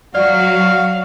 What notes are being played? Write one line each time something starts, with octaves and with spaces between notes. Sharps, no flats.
F#3 F#4 D5 F5